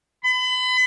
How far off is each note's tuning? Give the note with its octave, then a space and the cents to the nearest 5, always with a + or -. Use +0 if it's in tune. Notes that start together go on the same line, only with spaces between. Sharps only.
B5 +35